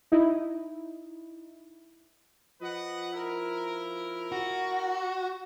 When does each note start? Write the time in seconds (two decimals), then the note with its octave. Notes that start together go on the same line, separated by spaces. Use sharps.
0.12 D#4 E4
2.61 F3 B4 D#5 F#5
3.13 E4 A#4
4.32 F#4